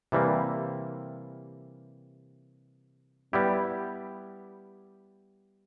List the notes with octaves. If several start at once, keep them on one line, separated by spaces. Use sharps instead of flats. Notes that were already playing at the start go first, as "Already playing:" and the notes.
C3 E3 G3 A#3
G3 B3 E4 G4